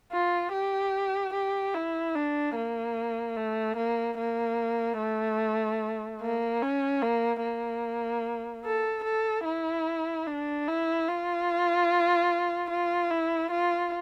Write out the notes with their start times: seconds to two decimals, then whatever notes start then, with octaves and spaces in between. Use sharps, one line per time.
0.12 F4
0.52 G4
1.33 G4
1.74 E4
2.15 D4
2.55 A#3
3.37 A3
3.77 A#3
4.18 A#3
4.99 A3
6.21 A#3
6.62 C#4
7.02 A#3
7.43 A#3
8.65 A4
9.04 A4
9.45 E4
10.27 D4
10.67 E4
11.08 F4
12.70 F4
13.11 E4
13.51 F4